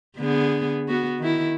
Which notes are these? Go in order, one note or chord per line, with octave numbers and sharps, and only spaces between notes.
D3 B3 G#4
B3 F#4
D#3 E4